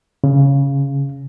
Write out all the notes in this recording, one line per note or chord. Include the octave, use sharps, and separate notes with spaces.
C#3